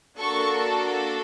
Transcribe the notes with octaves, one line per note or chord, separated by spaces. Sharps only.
A#3 D4 F#4 A4 C#6